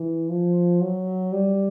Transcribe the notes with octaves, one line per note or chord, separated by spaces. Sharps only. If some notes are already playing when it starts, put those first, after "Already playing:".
Already playing: E3
F3
F#3
G3